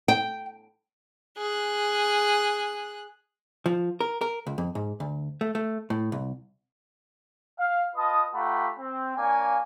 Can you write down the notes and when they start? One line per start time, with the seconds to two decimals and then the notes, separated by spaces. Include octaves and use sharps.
0.08 G5
1.37 G#4 F#6
3.66 F3
4.01 A#4
4.21 A#4
4.47 C#2
4.58 F2
4.75 G#2
5.00 D2
5.41 A3
5.55 A3
5.90 A2
6.12 C2
7.58 F5
7.95 F4 B4 D#5 A5 D#6
8.34 A3 F4 G4 F#5 A#5 B5
8.78 C4
9.16 A#3 D4 C#5 F5 G#5